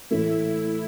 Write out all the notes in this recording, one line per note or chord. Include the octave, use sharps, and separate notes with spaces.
A2 E3 A3 E4